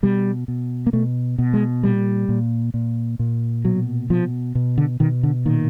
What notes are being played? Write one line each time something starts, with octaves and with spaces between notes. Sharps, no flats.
B2 G3
B2
A#3
B2 A3
B2
G#3
A#2 G3
A#2
A#2
A#2
B2 F#3
B2 F3
B2
D3
B2 D#3
D3
A#2 D#3